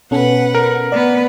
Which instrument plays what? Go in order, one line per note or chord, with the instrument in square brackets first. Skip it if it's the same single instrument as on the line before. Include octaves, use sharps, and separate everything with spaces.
[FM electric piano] B2 C#4 A4 [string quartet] B4 F#5
[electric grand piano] A#4
[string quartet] B3 B4 [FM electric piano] D5